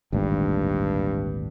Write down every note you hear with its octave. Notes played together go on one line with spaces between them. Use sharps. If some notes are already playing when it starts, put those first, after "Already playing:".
G#1 D2 G2 A#2